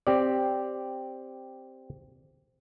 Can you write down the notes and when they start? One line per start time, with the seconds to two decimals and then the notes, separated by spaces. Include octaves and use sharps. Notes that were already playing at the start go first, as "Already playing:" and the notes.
0.07 C4 G4 D5